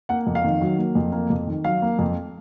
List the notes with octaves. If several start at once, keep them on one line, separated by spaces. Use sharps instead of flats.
A#3 F#5
F2
F5
D#3
F#3
A#3
F2
A#3
F2
D#3
F#3 F5
A#3
F2